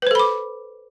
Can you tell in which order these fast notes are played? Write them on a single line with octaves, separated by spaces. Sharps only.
B4 C5 A4 B5 D6